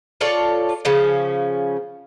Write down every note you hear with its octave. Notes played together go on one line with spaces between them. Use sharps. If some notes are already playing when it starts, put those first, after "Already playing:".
F4 A4 C#5 D5
C#3 F3 C#4